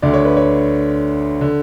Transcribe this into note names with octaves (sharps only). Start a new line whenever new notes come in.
D2 D3 D5
C#5
B4
C#5
D3